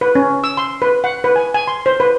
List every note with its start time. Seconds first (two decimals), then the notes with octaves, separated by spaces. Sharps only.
0.01 B4
0.15 C#4
0.44 E6
0.57 C6
0.82 B4
1.04 F#5
1.24 B4
1.36 G#5
1.54 G#5
1.68 C6
1.86 C5
2.00 B4